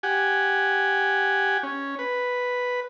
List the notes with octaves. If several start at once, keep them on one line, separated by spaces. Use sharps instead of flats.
G4 F#5 G#5
C#4
B4